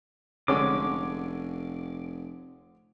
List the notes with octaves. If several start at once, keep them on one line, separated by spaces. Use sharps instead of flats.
F1 D3 G#3 C#4 D6